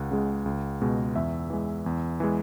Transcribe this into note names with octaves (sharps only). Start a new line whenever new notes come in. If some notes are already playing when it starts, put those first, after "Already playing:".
Already playing: C#2 F#5
C#3 G#3
C#2
B2 G#3
E2 E5
E3 G#3
E2
E3 G#3